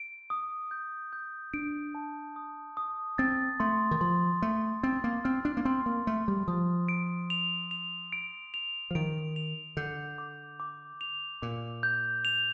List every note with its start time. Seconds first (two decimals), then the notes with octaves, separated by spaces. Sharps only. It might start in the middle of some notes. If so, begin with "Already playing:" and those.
Already playing: D7
0.30 D#6
0.71 G6
1.13 G6
1.53 D4 D7
1.95 A5
2.36 D#6
2.77 D#6
3.18 C4 A6
3.60 A3 C6
3.91 D#3
4.01 F3 C6
4.42 A3 C6
4.83 C4 A6
5.04 A#3
5.24 C4 F6
5.45 D4
5.57 A#3
5.65 C4 C6
5.86 A#3
6.07 A3 C6
6.28 G3
6.48 F3 D#6
6.89 D7
7.30 F7
7.71 F7
8.12 D7
8.54 F7
8.91 F3
8.95 D#3 D7
9.36 F7
9.77 D3 G6
10.18 D6
10.60 D6
11.01 F7
11.42 A#2 D6
11.83 G6
12.25 F7